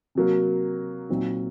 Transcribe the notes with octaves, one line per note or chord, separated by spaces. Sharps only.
C3 F#3 A#3
A#2 F#3 C4 D#4